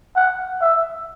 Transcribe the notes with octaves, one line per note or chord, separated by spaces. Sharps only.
F#5
E5